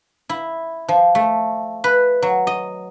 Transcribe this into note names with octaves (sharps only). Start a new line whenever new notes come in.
E4
F3
A3
B4
F#3
D#5